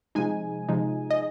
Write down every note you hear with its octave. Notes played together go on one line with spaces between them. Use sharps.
C3 F3 G#3 D#4 G#5
C3 F3 G#3 D#4
D#5